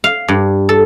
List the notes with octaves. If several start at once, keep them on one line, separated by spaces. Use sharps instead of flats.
F5
G2
A4